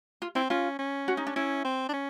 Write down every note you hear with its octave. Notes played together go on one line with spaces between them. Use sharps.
F4
C4 E4
C#4 F4
C#4
F#4
D#4
D4
C#4 E4
C4
D4
C#4